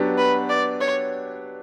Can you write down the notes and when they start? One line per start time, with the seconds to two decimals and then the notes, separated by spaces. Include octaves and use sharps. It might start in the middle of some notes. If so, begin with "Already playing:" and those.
Already playing: F#3 B3 D4 G4
0.18 B4
0.49 D5
0.81 C#5